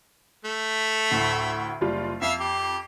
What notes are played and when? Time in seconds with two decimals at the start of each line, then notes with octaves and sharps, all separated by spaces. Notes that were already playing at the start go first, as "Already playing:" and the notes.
0.45 A3
1.10 D2 A2 C7
1.81 F#1 G3 F4
2.22 F2 E5 F5 C7
2.40 G4